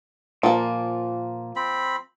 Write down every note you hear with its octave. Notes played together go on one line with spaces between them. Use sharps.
A#2 F3 A#3
C4 B5